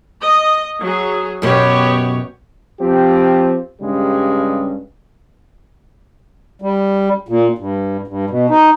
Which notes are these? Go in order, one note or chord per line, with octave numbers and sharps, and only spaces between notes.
D#5
F#3 G#4
F#2 B2 B3 G4 C#5
F3 C4 G4
G2 C#3 G3 G#3
G3
A#2
G2
G2
B2
D#4